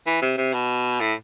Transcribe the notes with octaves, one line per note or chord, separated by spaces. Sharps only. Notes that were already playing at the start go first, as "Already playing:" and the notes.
E3
C3
C3
B2
A2